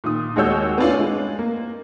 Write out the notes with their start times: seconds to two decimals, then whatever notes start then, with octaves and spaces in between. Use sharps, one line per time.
0.04 A#2 D#3 D#6
0.36 D#2 G#3 F#4 C#5 E6 G6
0.78 B3 C#4 D4 F4
0.99 G#3
1.39 A#3